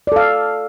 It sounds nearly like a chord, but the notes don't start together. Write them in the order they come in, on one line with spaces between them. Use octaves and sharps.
D5 A4 F5